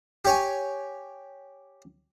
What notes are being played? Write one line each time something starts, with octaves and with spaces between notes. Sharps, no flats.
G4 C#5 G#5